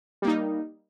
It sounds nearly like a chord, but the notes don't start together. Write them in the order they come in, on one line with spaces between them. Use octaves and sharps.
G3 A#3 D#4